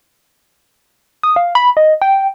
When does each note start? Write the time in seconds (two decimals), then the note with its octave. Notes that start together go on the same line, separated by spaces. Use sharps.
1.23 D#6
1.36 F5
1.55 B5
1.77 D#5
2.02 G5